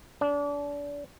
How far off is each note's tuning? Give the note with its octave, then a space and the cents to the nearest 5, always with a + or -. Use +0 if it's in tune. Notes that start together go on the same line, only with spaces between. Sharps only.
D4 -30